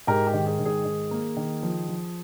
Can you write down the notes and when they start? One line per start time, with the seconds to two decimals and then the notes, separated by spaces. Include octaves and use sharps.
0.07 G#2 G4 A#4
0.27 G4
0.34 D#3
0.46 G#4
0.59 G#2
0.65 G#4
0.85 D#3
1.11 A#3
1.37 D#3
1.63 F3
1.88 F3